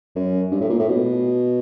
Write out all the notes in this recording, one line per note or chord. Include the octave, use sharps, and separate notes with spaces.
F#2
G2
A2
A#2
A2
B2